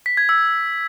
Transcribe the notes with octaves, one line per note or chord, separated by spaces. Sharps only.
B6
G#6
E6